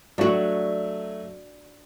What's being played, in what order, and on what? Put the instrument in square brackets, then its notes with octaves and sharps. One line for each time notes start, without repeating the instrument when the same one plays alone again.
[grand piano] F#3 A3 [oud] D4 F#4